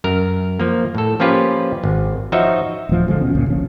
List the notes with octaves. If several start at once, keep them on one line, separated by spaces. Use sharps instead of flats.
F#2 A#4
F3 A#3
A2 A4
F3 A#3 C#4 F4 G4 B4
G#1
F3 D#4 F#4 C#5 D#5 E5
D1 F3
G#1 D3 F3 G#3
D#1 B2 C#4
C#2 F#2 A#2 C#3
G1 C#3 F3